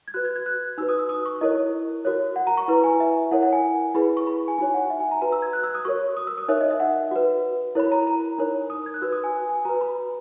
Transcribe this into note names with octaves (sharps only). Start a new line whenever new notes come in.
G#6
F#4 B4 F#6
G#6
G#6
F#6
D#4 F#4 B4 E6
D#6
E6
D#6
C#6
E4 A#4 C#5 D#5
F#4 A#4 C#5
F#5
A#5
C#6
E4 B4 A#5
G#5
E5
E4 A#4 C#5 F#5
F#5
G#5
E4 G#4 B4 B5
C#6
B5
G#5
D#4 F#4 C#5 G#5
F#5
E5
G#5
A#5
F#4 B4 A#5
E6
G#6
F#6
E6
D#6
F#4 A#4 C#5 C#6
D#6
E6
D#6
D#4 A#4 C#5 E5
D#5
E5
F#5
F#4 B4
E4 A#4 C#5 B5
A#5
A#5
D#4 A#4 C#5
D#6
G#6
F#6
F#4 B4 E6
D#6
G#5
G#5
F#4 B4 A#5
B5